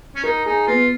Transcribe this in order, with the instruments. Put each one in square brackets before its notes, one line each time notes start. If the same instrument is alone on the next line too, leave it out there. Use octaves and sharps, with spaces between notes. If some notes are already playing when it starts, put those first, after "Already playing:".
[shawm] C#4
[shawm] D#4 [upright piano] A#4
[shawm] D#4 [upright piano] G#4
[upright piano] B3 [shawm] F4